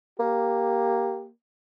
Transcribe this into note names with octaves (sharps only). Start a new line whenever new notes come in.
A#3 G4